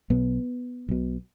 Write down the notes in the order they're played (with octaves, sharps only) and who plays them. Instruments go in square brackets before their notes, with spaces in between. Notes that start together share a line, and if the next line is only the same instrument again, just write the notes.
[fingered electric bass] B1 B2 B3
B1 B2